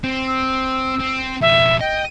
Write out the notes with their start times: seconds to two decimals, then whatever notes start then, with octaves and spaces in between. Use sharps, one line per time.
0.04 C4
0.27 E6
1.00 C4
1.41 F2 B2 E5
1.80 D#5 G5